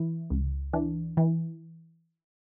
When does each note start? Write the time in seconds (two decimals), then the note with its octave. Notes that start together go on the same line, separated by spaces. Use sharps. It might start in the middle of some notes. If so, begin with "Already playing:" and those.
Already playing: E3 E4
0.30 C#2
0.73 E3 D4
1.17 E3